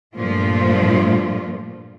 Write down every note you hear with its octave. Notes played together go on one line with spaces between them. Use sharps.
G2 A#2 F3 A3 F4